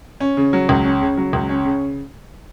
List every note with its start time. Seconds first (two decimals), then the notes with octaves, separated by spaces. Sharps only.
0.20 C#4
0.37 C#3
0.53 F#3
0.69 C#2
0.85 C#4
1.01 C#3
1.17 F#3
1.33 C#2
1.49 C#4
1.65 C#3